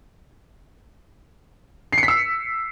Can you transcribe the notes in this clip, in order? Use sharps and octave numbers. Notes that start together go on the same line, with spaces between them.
C7
C#7
B6
E6